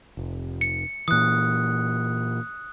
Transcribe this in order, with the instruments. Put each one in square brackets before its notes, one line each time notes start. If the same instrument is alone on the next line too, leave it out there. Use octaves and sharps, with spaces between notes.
[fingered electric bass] F1
[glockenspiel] C#7
[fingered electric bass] A#2 E3 [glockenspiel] D#6 F#6